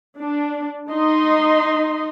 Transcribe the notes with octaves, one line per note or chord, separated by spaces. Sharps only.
D4
D#4 D#5 C6